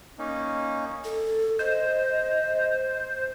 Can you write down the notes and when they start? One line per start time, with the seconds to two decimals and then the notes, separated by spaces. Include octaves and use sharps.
0.18 A#3 C#4 D#4
1.05 A4
1.59 C5 D#5